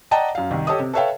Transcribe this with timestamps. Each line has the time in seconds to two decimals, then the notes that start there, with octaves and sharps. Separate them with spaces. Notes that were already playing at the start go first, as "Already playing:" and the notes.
0.11 D5 D#5 F#5 G5 A5 A#5
0.35 F#2 F5
0.51 C2 D#3
0.67 G4 A4 C#5 D#5 D#6
0.79 C3
0.94 A4 B4 C#5 E5 F5 G5